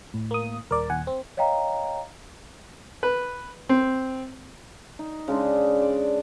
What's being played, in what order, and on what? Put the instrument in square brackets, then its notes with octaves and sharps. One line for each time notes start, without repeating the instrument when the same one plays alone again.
[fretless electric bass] A2
[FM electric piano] A#3 D#6
[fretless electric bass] D#1 [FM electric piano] A#4 D5
[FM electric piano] D#2 F#5 G#5
C4
[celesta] C#5 D#5 F5 G5 A#5
[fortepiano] B4
C4
[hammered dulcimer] D#4
C#3 G#3 D4
D5